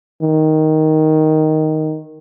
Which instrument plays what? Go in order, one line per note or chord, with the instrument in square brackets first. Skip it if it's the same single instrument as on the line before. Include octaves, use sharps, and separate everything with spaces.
[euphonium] D#3